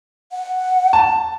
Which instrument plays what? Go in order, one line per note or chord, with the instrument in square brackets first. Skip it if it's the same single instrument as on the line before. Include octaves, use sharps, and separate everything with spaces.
[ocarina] F#5
[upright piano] A5